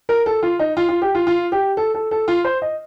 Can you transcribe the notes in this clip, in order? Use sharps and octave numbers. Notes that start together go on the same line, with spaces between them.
A#4
A4
F4
D#4
F4
F4
G4
F4
F4
G4
A4
A4
A4
F4
C5
D#5